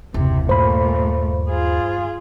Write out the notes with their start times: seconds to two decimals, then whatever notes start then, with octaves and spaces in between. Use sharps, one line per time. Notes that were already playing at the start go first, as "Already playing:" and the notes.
0.14 F#1 D#2 C3
0.49 G2 A#2 A3 C5 B5
1.50 F4 G#4